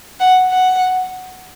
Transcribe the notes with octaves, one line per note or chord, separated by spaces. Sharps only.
F#5
F#5